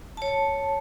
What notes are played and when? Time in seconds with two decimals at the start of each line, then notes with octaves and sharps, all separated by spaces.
0.17 C#5 A5